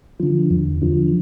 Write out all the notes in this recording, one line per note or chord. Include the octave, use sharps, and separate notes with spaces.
D3 F3
E2
D3 F3